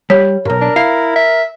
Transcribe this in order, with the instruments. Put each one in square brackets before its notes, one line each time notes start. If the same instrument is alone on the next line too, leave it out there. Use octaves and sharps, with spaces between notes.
[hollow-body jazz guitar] G3 [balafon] C#5
[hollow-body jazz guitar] B1 G2 [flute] A#4
[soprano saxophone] D4
[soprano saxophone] E4 [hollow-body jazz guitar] F5
[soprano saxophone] E5